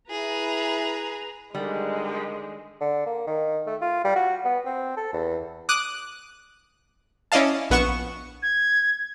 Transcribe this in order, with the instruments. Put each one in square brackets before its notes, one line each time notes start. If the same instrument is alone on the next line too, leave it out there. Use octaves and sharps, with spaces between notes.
[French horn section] E4 [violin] G#4 [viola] B4 A#5
[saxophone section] D3 D#3 [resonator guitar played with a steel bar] G3 [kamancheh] G#3
[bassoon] D3
A#3
D#3
A3
F4
G3
F#4
B3
C4
A4
E2
[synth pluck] D6 D#6 F#6
C#4 E4 D5 D#5 F5 A5
A#1 B3 F#5 C#6 E7
[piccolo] G#6